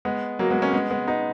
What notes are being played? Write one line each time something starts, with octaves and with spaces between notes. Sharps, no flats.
G#3 B3
F#3 A#3
G#3 B3
A#3 C#4
G#3 B3
G#3 B3
B3 D#4